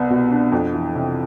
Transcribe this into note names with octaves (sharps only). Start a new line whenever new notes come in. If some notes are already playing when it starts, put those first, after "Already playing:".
Already playing: C2 B3
B2
D4
F2
E3
C3